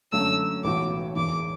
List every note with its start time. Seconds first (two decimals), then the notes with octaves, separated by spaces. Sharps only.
0.12 F#2 D3 A3 E6
0.64 B1 A2 E3 B3 F#4 D6
1.16 E1 E2 E3 D6